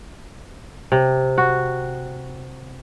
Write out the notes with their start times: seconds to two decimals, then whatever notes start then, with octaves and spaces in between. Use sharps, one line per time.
0.92 C3
1.38 F#4